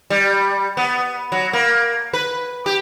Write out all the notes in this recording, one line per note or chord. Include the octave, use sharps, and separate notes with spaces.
G3
B3
F#3
A#3
B4
G4